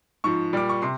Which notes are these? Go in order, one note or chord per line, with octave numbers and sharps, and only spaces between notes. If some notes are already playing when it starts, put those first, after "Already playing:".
G#2 F3 C#6
A#2 G3 D6
C#6
C3 C6